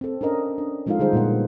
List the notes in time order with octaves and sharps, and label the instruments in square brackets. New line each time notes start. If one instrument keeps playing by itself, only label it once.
[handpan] C4 A4
C#4 D4 A#4 D#5
D4
F3 G#3 D#4 F4 A4 F5
D3 G3 D#4 G#4 C5
A#2 G#3 B3 A#4 F#5